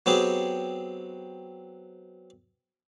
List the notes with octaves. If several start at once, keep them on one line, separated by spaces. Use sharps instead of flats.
F#3 B3 C4 G4 G#4